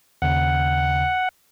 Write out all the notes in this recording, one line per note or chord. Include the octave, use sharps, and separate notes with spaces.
D#2 C#3 F#5